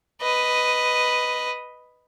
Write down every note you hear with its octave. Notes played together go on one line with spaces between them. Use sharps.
B4 D#5